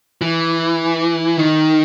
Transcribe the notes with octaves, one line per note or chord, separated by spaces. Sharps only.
E3
D#3